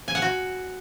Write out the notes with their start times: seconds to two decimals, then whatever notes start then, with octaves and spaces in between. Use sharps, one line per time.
0.08 G#5
0.15 F#5
0.22 F#4